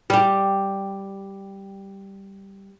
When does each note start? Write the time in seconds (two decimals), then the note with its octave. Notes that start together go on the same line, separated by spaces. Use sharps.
0.10 G3 G4